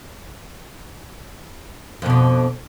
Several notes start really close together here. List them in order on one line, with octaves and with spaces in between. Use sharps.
F2 B2 D3